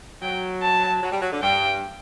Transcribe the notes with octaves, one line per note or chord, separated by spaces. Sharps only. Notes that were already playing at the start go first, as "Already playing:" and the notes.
F#3 G5
A5
F#3
G3
F#3
D3
G2 G5